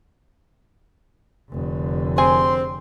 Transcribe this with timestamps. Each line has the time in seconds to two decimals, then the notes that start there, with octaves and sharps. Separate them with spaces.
1.49 F1 D3
2.18 C4 G#4 G#5 C6